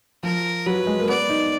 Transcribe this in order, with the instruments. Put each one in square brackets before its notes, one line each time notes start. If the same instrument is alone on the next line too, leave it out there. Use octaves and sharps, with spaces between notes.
[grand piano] F3 [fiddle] A#4
[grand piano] F#3 [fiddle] B4
[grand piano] G#3
A#3
[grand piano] B3 [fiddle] D5
[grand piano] D#4